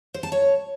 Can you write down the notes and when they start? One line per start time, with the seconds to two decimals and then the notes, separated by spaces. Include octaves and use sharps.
0.14 C5
0.23 A5
0.32 C#5